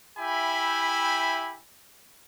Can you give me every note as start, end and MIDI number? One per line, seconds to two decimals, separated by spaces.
0.19 1.59 64
0.19 1.59 67
0.19 1.59 76
0.19 1.59 79
0.19 1.59 80
0.19 1.59 83